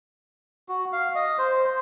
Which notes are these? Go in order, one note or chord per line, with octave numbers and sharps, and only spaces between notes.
F#4
F5
D#5
C5